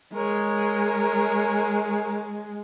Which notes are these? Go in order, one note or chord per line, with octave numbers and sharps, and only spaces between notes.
G#3 A#4 C#5